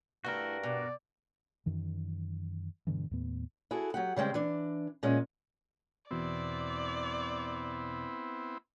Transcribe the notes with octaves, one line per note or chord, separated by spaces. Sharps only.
G2 A3 E4 F#4 A#4
B2 D5
F#2 D#3 E3
G2 B2 D3 E3
D#2 A2 B3
E4 F#4 G#4 A4
F#3 G4 F#5
C#3 G3 G#3 C4 G5
E3 D4
A#2 G#3 C#4
E2 B2 B3 C4 E4 D5